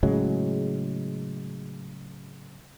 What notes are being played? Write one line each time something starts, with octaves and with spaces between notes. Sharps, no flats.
A2 C#3 F#3 G#3